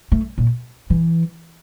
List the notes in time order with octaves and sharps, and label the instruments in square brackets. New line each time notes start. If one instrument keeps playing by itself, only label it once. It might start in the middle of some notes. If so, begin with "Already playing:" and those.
[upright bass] A3
A#2
E3